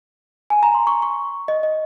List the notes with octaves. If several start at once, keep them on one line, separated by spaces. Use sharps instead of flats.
G#5
A#5
C6
C#6
C#6
D#5
D#5